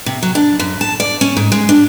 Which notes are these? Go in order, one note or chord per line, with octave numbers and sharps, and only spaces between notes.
C3
F#3
D4
F#2
A5
D5
C#4
G#2
G#3
D4